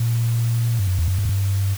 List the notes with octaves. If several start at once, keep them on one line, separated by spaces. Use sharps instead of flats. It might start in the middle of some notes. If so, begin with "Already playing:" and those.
Already playing: A#2
G2
F#2
E2
F#2
G2
F#2
G2